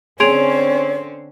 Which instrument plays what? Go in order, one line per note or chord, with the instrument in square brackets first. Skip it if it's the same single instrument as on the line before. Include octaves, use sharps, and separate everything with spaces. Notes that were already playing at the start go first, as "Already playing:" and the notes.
[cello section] D3 C4 C#4 [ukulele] G#4 [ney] C#5 [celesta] C6 D7 F7